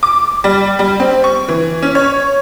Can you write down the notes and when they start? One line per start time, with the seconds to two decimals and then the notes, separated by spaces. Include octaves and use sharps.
0.03 D6
0.44 G3
0.79 G3
1.00 C4
1.24 C#6
1.48 E3
1.82 C#4
1.95 C#5